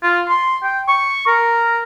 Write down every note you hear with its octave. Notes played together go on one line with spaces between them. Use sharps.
F4
C6
G5
C#6
A#4